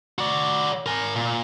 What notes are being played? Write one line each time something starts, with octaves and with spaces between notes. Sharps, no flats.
F#4 D5
A#4 G#5
A#2